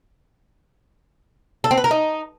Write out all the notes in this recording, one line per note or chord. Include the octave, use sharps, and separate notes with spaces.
A4
C4
B4
A#4
D#4